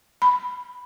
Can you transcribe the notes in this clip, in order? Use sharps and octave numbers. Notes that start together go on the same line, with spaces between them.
B5